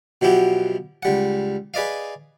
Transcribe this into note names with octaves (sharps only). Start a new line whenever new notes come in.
B2 F3 F#3 E4 G4
C#2 G3 F#5
G#4 B4 D5 D#5 F5